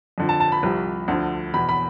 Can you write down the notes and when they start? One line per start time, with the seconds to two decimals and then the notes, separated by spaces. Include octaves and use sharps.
0.18 F2 D3 F3
0.29 A5
0.40 A5
0.52 B5
0.63 C2 C3 F3
1.08 D2 D3 F3
1.54 E2 B2 B5
1.69 B5